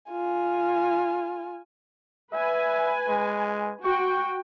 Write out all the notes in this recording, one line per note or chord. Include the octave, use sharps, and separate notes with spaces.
F4 G#5
B4 E5 G#5
G#3
F#4 G5 C#6